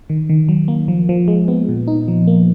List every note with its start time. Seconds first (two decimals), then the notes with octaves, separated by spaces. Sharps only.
0.10 D#3
0.29 D#3
0.49 F#3
0.68 A#3
0.88 F3
1.09 F3
1.28 G#3
1.48 B3
1.69 A#2
1.87 D#4
2.08 F3
2.27 A#3